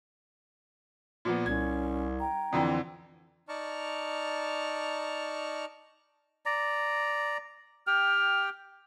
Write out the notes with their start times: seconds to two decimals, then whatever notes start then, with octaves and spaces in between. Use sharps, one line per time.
1.25 A#2 F3 B3
1.46 C2 C#4 G#6
2.19 G5 A#5
2.53 F2 D3 E3 C4
3.49 D#4 D5 A5 A#5 C#6 F6
6.46 D5 A#5
7.87 G4 G5 F6